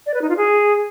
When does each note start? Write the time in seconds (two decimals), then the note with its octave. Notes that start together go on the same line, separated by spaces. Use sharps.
0.06 D5
0.14 B4
0.22 D#4
0.29 F4
0.37 G#4